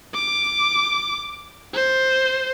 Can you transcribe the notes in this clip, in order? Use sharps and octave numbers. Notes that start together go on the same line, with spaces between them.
D6
C5